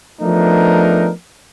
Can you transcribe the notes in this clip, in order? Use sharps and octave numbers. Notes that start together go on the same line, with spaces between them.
F3 A3 B3 D4 D#4 A#4